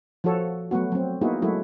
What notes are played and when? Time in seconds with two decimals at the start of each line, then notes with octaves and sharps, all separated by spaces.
0.24 F3 F4 F#4 A4 C#5
0.71 F#3 A3 B3 F#4
0.92 F#3 C4
1.21 A#3 B3 D#4 E4 F#4 G#4
1.42 F#3 G#3 A3 E4 F#4